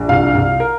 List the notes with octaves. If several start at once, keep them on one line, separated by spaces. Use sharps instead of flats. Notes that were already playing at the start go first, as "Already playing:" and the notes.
Already playing: A#1
C2 F5
C2
A#4